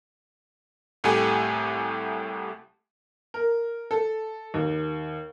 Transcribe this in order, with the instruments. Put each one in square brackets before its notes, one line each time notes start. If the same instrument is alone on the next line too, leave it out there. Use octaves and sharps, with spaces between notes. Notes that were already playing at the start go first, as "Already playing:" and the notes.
[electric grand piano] C2 A2 A3 G4 G#5
[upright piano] A#4
A4
D#2